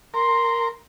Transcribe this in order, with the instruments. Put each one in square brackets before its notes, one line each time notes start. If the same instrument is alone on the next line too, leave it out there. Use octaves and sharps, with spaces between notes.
[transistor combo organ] A#4 [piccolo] C6